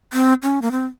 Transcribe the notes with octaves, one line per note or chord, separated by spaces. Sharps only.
C4
C#4
A#3
C4